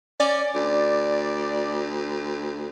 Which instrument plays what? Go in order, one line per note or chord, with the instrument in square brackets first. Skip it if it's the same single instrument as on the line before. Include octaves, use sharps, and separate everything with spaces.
[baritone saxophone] C#4 [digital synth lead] D5
[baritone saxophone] D2